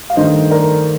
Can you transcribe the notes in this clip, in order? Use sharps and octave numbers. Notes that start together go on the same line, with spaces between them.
F5
G2 D#3 A3 C5 D#5
A#4 D5